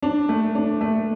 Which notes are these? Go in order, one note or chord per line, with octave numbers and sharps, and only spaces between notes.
D4
A3
D4
A3